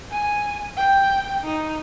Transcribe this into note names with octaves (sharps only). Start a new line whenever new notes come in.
G#5
G5
D#4